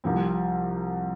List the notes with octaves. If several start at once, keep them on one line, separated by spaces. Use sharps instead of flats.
C2 C3 F3 C4